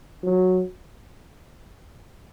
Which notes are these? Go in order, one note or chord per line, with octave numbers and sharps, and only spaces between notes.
F#3